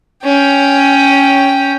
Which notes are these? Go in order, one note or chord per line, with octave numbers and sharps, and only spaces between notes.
C#4 G5